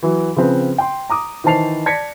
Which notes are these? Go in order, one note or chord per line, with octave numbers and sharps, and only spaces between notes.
E3 F#3
C#3 F3 C4 B4
G5 C6
A#5 D6 D#6
D#3 E3 C5 A5 C7 F7
D5 A5 G#6 A#6 B6 C#7